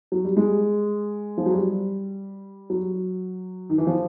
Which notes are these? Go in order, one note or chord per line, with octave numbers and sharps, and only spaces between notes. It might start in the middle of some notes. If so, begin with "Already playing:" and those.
F#3
G3
G#3
F3
F#3
G3
F#3
D#3
E3
F3